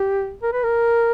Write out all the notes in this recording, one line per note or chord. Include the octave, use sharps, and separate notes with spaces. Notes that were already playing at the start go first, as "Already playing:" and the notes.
Already playing: G4
A#4
B4
A#4